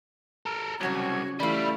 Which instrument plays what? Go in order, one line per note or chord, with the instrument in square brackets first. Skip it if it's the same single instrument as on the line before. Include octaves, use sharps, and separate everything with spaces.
[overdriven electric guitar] A4 A#4
[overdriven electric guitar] C2 [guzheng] C#3 F#3 C#4 [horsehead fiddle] F#4 [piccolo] G#6
[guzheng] E3 F5 [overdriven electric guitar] G3 [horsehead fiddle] A3 E4 [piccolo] B5